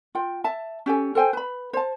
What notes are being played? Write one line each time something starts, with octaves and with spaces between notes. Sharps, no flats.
F4 G5
E5 A5
C#4 G4 A4 G#5
A4 C5 G5 G#5
B4 B5
C5 A5